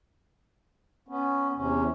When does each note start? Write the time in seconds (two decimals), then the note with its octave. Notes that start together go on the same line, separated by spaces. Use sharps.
1.08 B3 C#4
1.55 E2 C3 C#4